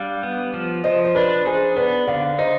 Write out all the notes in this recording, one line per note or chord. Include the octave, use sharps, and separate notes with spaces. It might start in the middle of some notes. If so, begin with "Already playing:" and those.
Already playing: G3 D4 F5
B3
F3
F3 C5 D#5
C5
D4 B4 D5
D#4 G#4 C5
B3 B4 D5
D3 D5 F5
D#4 C5 D#5